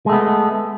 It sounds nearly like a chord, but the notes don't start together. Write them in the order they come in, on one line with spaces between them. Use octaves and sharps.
G#3 A3 B3